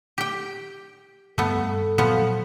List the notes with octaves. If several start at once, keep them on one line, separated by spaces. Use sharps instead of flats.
G4 G5
G2 A3 B3 A4
A#2 F3 F#3 B3